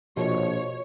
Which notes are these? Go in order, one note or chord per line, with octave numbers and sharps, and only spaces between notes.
A#1 B2 F3 C#5